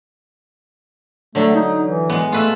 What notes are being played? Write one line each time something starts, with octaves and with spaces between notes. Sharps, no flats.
D3 F#3 A3
D#4
E3
G#3 B3
A3 F4 B4 E5